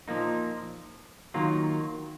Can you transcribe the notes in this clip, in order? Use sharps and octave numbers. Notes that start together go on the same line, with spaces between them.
A#2 F3 A#3 D#4
D#3 F#3 A#3 F4